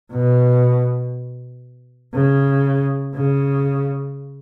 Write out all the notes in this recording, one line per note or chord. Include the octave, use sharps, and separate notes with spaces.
B2
C#3
C#3